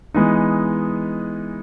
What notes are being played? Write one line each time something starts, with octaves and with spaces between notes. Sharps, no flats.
E3 G#3 B3 D#4